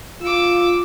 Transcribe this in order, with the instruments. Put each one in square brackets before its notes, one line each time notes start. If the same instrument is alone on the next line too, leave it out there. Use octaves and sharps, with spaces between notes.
[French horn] F4 [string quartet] D6 E6